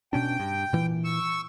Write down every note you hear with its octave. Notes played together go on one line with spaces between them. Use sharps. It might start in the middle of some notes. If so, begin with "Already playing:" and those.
B2 C#4 D4 G5
G2
A#2 E3
C#6 E6